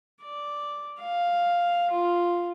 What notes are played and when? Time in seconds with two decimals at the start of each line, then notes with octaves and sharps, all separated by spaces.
0.22 D5
1.00 F5
1.91 F4